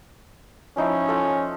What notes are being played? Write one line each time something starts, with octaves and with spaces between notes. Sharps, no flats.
F3 C#4 D#4 E4
F4 A4